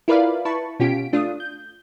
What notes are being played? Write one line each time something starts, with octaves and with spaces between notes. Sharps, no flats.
E4 F4 A#4 B4 D5 F5
E4 B4 A5 C#6
B2 C#4 F4 G4 B6 D7
A3 D4 F4 D#6
G6